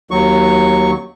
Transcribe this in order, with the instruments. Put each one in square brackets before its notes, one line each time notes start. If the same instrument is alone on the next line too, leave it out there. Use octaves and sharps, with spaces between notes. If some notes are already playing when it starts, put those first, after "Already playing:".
[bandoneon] D#2 F#3 C#6